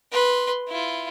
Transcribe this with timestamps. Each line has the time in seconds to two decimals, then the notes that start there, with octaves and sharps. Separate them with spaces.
0.12 B4 C6
0.68 E4 F4